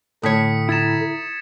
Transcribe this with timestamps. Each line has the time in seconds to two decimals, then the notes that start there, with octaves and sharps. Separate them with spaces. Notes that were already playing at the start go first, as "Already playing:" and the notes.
0.23 A2 D3 C#5 D#6 B6 C#7
0.69 E4 A#5 G#6 A6 E7